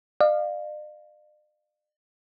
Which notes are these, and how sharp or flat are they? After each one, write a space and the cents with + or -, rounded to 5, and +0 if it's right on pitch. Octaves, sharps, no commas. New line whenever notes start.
D5 +45 F5 +0